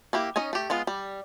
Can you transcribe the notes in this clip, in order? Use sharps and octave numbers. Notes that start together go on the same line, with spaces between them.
A#3 E4 G4
C#4 D#4 D#5 G#5
A3 G4
G#3 B3 F4
G3